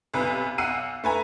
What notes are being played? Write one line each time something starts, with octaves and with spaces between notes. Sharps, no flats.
B1 C3 B4
B1 F#5 E6 C7 D#7
A3 B4 G#5 A#5